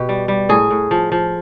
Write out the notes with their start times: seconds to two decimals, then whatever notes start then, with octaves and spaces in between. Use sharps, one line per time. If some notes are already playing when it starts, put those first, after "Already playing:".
Already playing: B2 G4
0.09 G3
0.28 G3
0.49 A2 G#4
0.71 A2
0.91 F3
1.12 F3